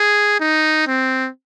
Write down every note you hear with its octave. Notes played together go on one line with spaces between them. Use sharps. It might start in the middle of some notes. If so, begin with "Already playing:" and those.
Already playing: G#4
D#4
C4